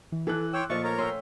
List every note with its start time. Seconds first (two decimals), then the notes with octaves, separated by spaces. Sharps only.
0.12 E3
0.27 E3 A4 F#6
0.53 C#5 G5 C6 D6 E6
0.70 A#2 F3 A3 D#5 C#6 A6
0.84 A#4 C#5 A#5
0.98 C#4 E5 G5 C6